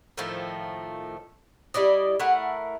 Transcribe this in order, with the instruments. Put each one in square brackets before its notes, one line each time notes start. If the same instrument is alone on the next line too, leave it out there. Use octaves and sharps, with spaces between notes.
[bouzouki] A2 D#3 F3 A3
G3 E4 D5 D#5
A3 E4 A#4 F#5